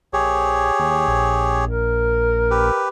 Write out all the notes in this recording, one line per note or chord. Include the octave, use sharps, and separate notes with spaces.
A#1 G4 G#4 C#5
D#2
A#1
A#4
G4 B4